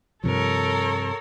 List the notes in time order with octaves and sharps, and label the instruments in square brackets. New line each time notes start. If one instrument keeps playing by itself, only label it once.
[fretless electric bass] G2 C3 F3 [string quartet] A4 A#4 C#5